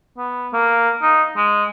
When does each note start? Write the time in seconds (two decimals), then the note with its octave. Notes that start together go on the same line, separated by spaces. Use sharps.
0.18 B3
0.53 A#3
1.02 D#4
1.37 G#3